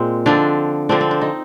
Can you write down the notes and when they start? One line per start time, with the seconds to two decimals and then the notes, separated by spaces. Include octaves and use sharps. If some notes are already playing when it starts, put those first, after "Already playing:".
Already playing: A#2 G#3 C4
0.26 D3 F3 C4 D4
0.89 D3 F3 C4 D4
1.01 C4
1.11 D4
1.21 D#4